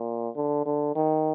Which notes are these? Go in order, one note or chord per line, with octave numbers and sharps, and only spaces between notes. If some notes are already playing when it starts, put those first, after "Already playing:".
Already playing: A#2
D3
D3
D#3